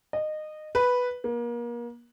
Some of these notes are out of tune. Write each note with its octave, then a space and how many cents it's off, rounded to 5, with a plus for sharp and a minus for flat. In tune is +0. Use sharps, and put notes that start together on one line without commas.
D#5 -20
B4 +0
A#3 +35